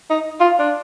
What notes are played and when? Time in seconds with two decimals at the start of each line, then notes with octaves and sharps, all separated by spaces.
0.10 D#4
0.40 F4
0.59 D4